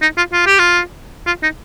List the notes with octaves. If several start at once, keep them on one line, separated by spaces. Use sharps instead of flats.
D#4
F4
F4
G4
F4
F4
D#4